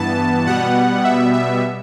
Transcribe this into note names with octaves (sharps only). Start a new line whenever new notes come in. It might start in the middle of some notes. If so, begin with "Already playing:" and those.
Already playing: G2 E3 B3 A5
B2 G3 B3 F#5
E5
E5